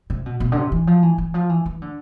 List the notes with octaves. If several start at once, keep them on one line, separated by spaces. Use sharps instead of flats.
C3
B2
B2
D3
C3
E3
F3
E3
E3
F3
E3
E3
D3